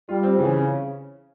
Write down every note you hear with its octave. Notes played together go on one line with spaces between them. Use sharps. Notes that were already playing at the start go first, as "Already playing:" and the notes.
G3 F4
C4
C#3 E3
C#4